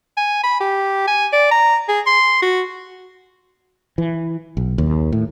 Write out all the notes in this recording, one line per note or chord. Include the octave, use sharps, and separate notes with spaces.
G#5
B5
G4
G#5
D5
A#5
G#4
C6
F#4
E3
B1
D#2
A2